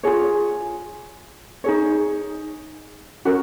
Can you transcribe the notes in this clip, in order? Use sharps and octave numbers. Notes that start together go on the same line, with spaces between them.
F4 G#4 C#5
D#4 G#4 C#5
C#4 F#4 A#4